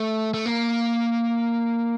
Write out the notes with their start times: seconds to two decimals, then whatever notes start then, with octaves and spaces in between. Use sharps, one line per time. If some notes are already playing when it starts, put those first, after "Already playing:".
Already playing: A3
0.34 A3
0.46 A#3